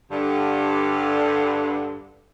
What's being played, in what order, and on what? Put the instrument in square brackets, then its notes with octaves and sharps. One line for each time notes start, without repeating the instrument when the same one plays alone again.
[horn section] G2 D3